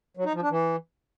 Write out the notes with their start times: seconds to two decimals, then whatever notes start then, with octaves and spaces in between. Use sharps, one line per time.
0.17 F#3
0.25 D#4
0.34 F3
0.42 D4
0.50 E3